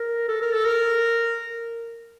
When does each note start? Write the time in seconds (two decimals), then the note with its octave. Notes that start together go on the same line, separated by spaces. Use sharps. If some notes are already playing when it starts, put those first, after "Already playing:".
Already playing: A#4
0.28 A4
0.42 A#4
0.53 A4
0.65 A#4